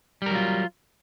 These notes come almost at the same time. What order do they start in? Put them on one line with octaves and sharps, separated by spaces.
G3 A#4 F#3 F4